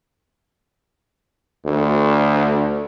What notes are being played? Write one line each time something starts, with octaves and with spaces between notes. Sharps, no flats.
D2